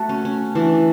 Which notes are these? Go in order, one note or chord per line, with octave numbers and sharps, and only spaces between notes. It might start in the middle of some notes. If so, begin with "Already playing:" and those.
Already playing: A3 F#4
C#4
C#4
E3 D4